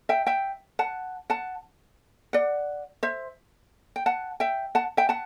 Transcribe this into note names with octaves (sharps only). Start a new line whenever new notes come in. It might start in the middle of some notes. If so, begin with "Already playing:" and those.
E5 G5
E5 G5
F#5 A5
F#5 A5
D5 F#5
C5 E5
G5
F#5 A5
E5 G5
F#5 A5
E5 G5
F#5 A5